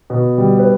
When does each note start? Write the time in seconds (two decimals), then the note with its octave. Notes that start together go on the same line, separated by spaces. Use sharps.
0.10 B2
0.38 G3
0.59 B4